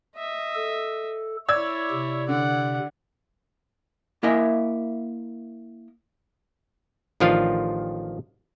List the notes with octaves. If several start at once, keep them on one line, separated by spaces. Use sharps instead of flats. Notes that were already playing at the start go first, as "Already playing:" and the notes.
D#5 E5
A4
E4 C#5 D5 E6 G#6
C3
D3 D5 F#5
A#3 E4 A#4 D#5 E5 G#5
A1 D#3 F3 D4 F4 F5